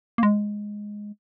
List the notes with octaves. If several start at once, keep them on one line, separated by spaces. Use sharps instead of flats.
A#3
G#3